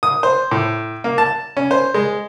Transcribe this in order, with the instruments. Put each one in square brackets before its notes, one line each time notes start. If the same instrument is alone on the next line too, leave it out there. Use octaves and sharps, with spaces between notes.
[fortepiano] D#6
C5
A2
A#3
A5
C#4
C5
G#3